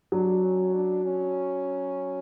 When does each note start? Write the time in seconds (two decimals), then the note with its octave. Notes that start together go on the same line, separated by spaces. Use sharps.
0.12 F#3 D4
0.44 C#4
0.74 D4
1.05 C#4